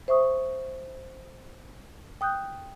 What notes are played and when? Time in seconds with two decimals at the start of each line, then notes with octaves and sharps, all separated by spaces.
0.08 C5 E5 C#6 D#6
2.21 G5 D#6 F#6 G6